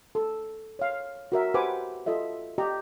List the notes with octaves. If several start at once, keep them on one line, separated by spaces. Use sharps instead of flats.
A4
C#5 F5
F#4 A#4 E5
G4 B4 C5 F#5 G#5 D6
F4 A4 D#5 E5
G4 D#5 A#5